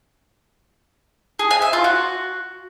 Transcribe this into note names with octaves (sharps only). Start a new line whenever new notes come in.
G#4
G#5
E5
F4
F#4